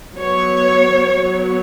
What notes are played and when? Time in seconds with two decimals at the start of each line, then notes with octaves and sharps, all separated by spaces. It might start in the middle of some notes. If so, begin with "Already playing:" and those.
0.15 F#3 B3 C#5
1.10 F#3 B3